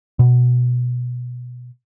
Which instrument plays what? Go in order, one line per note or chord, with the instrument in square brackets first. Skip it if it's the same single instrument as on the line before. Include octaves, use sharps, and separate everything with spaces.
[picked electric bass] B2